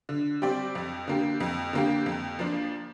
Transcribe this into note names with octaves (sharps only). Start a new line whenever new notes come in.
D3
G3 C4 G4 D5
F2
D3 A#3 G4
F2
D3 A#3 G4
F2
F3 A#3 D4